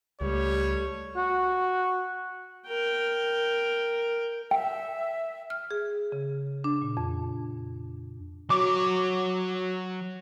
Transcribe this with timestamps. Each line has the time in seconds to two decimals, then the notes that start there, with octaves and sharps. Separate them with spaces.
0.21 C#2 G3 A3 C#5
1.16 F#4
2.68 A#4 G5
4.51 E5 G5
5.50 F6
5.71 G#4
6.12 C#3
6.64 D4
6.82 A#2
6.97 F2
8.50 F#3 F#4 C#5 D6